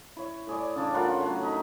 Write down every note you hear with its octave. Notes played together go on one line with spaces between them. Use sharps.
E4 C#5
A2 G#4 D5
C#3 D4 A5 D6
A2 F4 A#4 F#5
F#3 A3
D#4 E5